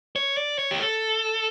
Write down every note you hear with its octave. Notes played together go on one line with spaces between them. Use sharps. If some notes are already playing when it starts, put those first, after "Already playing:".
C#5
D5
C#5
G4
A4